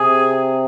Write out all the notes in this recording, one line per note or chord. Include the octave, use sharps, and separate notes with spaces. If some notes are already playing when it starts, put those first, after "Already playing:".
Already playing: C3 G#4